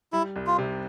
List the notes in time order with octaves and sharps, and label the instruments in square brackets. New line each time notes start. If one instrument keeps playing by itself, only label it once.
[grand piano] G3 [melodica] E4
[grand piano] C2
[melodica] F4
[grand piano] C3